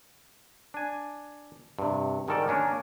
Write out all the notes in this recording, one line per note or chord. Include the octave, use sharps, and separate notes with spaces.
D4 G#5
G2 C3
G#2 D#3 G3 A4 A#4 D5
A#3 C#4 D4 A#4